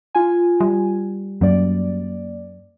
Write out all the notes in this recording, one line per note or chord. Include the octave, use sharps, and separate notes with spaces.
F4 G#5
G3
F#2 A#3 D5